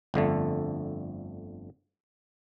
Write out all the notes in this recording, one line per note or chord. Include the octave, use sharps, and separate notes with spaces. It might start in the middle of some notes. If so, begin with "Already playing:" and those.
G1 F2 D3 A3